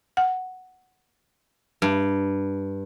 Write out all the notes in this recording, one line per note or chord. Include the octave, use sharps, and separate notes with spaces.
F#5
G2